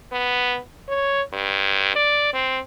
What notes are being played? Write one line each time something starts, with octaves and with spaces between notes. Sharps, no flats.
B3
C#5
G2
D5
C4